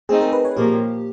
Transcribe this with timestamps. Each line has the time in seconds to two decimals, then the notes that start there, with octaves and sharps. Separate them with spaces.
0.09 A3 C4 D#4 G#4
0.21 A#4
0.32 B4
0.45 C#5
0.57 A#2 F3 A#3 G4